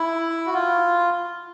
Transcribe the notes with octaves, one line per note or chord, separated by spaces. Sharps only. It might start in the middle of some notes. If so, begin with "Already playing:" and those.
Already playing: E4
F#4
F4